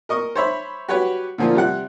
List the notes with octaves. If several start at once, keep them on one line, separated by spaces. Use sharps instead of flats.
A#4 D#5 C#6 D#6
C5 C#5 E5 B5
F#4 G4 B4 C#5 F#5
A#2 D3 F3 A#3 F4
C3 G3 F#5 F#6